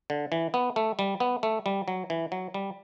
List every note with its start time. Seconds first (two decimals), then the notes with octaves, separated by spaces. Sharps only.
0.10 D3
0.32 E3
0.54 B3
0.76 A3
0.99 G3
1.20 B3
1.43 A3
1.66 G3
1.88 F#3
2.10 E3
2.32 F#3
2.54 G3